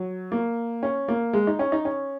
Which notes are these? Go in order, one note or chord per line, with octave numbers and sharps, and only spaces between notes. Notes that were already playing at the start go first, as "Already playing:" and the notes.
Already playing: F#3
A#3
C#4
A#3
G#3
D#4
C#4
D#4
C#4